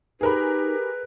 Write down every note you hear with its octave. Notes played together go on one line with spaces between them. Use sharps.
D#4 G4 G#4 A#4 B4 B5